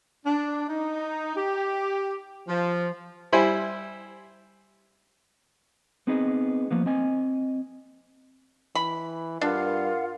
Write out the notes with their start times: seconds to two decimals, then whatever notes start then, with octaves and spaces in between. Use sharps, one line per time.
0.25 D4
0.68 D#4
1.36 G4
2.48 F3
3.32 G3 E4 C5 G#5 B5
6.07 B3 C4 D#4 G#4 B4 D#5
6.71 F3 A#3 B3
6.86 C4 D#5 G#5
8.75 E3 B5
9.41 G2 D4 F4 A#4 F5 F#5